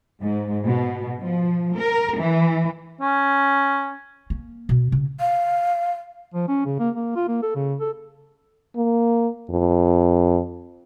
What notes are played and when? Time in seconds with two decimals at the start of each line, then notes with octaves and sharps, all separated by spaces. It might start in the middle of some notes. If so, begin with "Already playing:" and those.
0.21 G#2
0.65 B2
1.20 F3
1.76 A#4
2.19 E3
3.01 C#4
4.30 A#3
4.69 B2
4.92 C#3
5.20 F5
6.34 F3
6.48 C#4
6.66 C#3
6.79 A#3
6.96 A#3
7.16 F4
7.28 A#3
7.43 A4
7.55 C#3
7.80 A4
8.76 A#3
9.50 F2